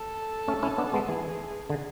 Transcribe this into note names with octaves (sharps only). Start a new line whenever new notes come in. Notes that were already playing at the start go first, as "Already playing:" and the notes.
Already playing: A4
A3 C#4
C#4 E4
B3 D4
G#3 B3
E3 G#4
D3